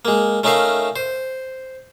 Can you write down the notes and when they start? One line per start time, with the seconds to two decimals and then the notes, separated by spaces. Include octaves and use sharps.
0.05 G#3 A#3
0.43 A3 C#4 D#4 A#4 E5 F5
0.96 C5